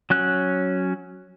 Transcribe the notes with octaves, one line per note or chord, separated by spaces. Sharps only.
F#3 C#4 F#6